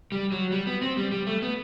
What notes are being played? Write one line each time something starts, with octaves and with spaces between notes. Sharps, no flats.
G3
F#3
G3
B3
C4
G3
G3
A3
B3